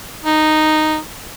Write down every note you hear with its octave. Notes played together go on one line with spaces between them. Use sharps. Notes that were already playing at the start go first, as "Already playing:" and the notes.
D#4